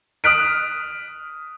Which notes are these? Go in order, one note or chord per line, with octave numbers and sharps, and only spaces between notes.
D#6 F6 F#6 B6 D7